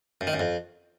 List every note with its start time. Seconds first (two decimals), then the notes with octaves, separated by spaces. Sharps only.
0.21 F#2
0.27 D#3
0.33 F#2
0.40 F2